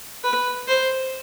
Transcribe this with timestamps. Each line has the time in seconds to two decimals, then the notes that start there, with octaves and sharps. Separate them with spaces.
0.24 B4
0.68 C5